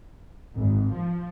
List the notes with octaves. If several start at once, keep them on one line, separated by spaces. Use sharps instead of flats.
G#1
F3